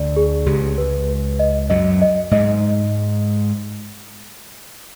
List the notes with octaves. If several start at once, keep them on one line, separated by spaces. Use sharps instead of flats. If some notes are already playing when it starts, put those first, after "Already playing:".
Already playing: D2 D3 D5
G#4
C#2 C#3 G4
B4
B4
D#5
F#2 F#3 D#5
D#5
G#2 G#3 D#5